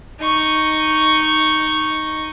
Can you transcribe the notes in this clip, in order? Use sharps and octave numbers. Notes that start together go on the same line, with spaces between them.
D#4 C#6